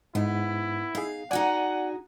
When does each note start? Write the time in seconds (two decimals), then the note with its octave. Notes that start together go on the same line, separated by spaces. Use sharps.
0.15 G#2 B3 D#4 E4
0.95 D#4 G#4 F5
1.31 D#4 F#4 G#4 D5 F#5 G#5